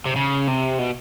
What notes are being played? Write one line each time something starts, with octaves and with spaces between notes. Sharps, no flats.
C3
C#3
C3
B2